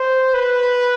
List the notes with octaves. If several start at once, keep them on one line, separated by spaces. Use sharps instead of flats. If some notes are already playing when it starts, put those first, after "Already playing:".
Already playing: C5
B4